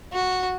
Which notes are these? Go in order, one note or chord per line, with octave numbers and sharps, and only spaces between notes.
F#4